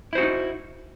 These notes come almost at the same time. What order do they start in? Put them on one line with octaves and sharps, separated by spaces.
E4 C5 F#4 C#4 D#4